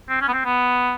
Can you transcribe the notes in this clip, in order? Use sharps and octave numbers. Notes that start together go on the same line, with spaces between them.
C4
C#4
B3
C4
B3